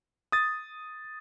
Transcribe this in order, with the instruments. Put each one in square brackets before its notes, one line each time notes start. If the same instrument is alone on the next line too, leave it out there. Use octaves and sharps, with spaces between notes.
[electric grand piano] D#6 A6